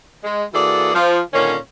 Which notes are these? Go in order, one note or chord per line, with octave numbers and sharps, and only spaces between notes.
G#3
E3 A#3 F#4 G#4 A4 D5
F3
A#2 D3 D#3 A#3 C#4